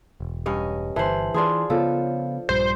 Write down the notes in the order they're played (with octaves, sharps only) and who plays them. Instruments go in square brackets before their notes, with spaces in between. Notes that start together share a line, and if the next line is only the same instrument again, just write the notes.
[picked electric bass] E1
[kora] G2 C#4 D#5
[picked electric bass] G1 [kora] E3 C5 [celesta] A5 F#7
[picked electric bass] E3 [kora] D4 F4 G#4 [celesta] A5 C6
[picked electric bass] C#3 B3 [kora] F3 A4 [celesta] F4 C#5 F5
[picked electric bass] A#1 G2 G3 [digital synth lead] C5